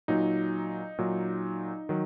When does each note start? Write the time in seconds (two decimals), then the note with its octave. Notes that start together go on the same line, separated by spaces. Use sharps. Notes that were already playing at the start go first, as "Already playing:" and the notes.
0.08 A#2 F#3 D#4
0.98 A#2 F#3
1.89 D#3 F#3